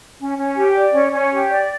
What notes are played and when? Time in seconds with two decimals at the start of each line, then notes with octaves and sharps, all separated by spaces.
0.20 C#4
0.38 C#4
0.56 G4
0.75 D5
0.93 C#4
1.12 C#4
1.30 G4
1.49 D5